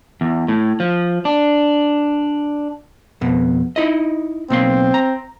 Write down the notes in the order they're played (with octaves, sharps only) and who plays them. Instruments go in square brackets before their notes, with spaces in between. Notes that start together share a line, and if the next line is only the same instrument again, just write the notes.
[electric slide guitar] E2
A2
F3
D4
[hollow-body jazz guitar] F2 B2
D#4 E4 D#5
[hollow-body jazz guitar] B1 A#3 C6 [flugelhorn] C4
[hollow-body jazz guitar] A#5